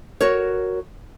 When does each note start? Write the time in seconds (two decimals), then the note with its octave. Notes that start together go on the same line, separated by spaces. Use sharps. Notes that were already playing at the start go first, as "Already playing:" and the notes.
0.21 F#4 A#4 C#5